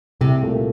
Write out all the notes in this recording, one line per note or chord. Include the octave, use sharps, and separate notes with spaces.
C2 C3
A#2 A3